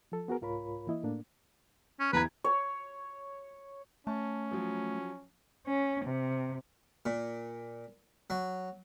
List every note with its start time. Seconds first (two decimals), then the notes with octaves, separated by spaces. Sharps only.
0.12 F3 A4
0.28 B3 F#4 G#4 A#4
0.41 C2 G#2 F4 A#4 C#5 B5
0.87 E3 A#3 E4 D#5
1.03 A2 A3 A#3 D4
2.00 C#4
2.13 E2 B4 A#5 G#6
2.44 C#5
4.07 A3 C#4 A5
4.51 F3 F#3
5.67 C#4
6.05 C3
7.06 A#2
8.30 F#3